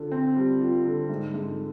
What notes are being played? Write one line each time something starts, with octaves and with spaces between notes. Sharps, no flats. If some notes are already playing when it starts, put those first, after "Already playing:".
Already playing: D3 F4
C4
G3
F4
D3
G#2
G#2